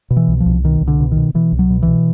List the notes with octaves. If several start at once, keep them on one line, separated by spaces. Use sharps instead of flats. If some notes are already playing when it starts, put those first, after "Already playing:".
B2
E3
C2
F3
C2
B2 D#3
C2
D3
B2
D#3
B2
B2 E3
C2
F#3
B2
E3
B2